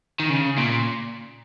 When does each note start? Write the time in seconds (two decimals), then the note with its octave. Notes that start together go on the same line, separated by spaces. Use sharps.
0.20 D#3
0.30 C#3
0.58 A#2